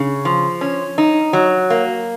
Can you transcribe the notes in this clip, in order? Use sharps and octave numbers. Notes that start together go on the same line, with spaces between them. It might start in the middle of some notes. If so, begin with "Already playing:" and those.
Already playing: C#3
F3
C#4
D#4
F#3
A#3